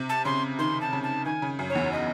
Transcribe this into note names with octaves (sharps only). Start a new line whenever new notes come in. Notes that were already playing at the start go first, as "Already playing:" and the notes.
Already playing: C3
A5
C#3 C6
D#3 C6
A5
C#3
A5
D#3 G#5
C#3
F#2
C#5
E2
D#5